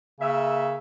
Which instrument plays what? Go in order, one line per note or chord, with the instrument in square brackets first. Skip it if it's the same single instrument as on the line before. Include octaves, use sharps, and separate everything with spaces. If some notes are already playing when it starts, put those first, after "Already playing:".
[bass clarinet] C#3 [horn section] A#3 E5